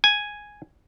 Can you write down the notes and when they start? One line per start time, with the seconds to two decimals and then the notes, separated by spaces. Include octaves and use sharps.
0.04 G#5